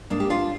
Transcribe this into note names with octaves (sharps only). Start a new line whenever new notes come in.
G#2 A#3 D4
G4
D4 F4